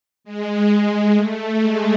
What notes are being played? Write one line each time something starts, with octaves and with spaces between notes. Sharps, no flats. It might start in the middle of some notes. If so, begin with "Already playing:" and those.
G#3
G#3
A3
G#3